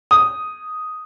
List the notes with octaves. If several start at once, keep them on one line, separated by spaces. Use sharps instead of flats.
D#6